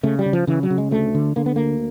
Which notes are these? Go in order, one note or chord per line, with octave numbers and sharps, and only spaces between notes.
C#3 A3
G3
C#3
F3
C#3 E3
F#3
C#3
G#3
D2 A3
D3
D3 A#3
B3
D2 A#3